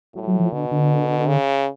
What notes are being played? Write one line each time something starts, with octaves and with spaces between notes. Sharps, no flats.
A2 F#3
F#3
F3
B2 D3
D3
C#3